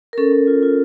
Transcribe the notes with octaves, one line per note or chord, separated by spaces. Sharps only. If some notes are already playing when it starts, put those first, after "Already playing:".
A#4
C#4 A4
C#4
F4
F4